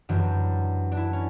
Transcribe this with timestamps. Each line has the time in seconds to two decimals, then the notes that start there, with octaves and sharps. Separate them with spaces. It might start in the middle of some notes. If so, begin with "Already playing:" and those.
0.09 F#2 E3 G3 D4
0.92 D4
0.97 E4
1.13 C#4